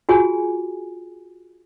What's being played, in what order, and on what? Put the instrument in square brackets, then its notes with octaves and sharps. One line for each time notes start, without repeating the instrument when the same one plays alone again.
[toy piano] F4 F#4 G#4 G#5